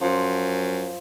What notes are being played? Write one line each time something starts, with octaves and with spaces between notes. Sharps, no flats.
F#2 F3